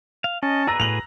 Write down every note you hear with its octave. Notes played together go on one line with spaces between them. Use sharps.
F5
C#4 D#5 A5
F#4 G#4 B4 A#5 E6 A#6
A2 A#5 F7 F#7